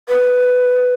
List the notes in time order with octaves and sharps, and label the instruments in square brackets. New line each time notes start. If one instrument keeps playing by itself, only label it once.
[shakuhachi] B4